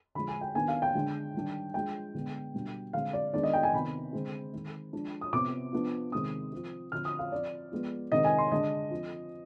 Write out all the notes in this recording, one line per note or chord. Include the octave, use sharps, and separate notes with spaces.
D3 F3 G#3 B5
G#5
G5
D#3 B3 D4 G#5
F5
G5
D3 G#3 D4
D#3 G3 D4
F3 G#3 D4 G5
D3 G#3 B3 D4
B2 G3 D4
D3 G#3 C4 F5
D5
D#3 G#3 B3 D4 D5
D#5
G5
G#5
C3 D#3 B3 B5
D3 G#3 C4
D#3 G#3 C4
F3 G#3 D4
D#6
C3 F3 B3 D6
F3 B3 D4
C3 D#3 G#3 C4 D#6
F3 C4
D3 F3 C4 F6
D#6
F5
F3 C4 D5
F3 G#3 B3
C3 D#3 G#3 C4 D#5
G#5
C6
D3 G#3 D4 D#5
F3 C4